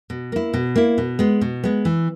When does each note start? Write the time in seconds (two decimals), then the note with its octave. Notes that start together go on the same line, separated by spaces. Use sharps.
0.10 B2
0.32 A#3 E4
0.54 B2
0.76 A#3 E4
0.98 B2
1.19 G#3 B3
1.41 B2
1.64 G#3 B3
1.85 E3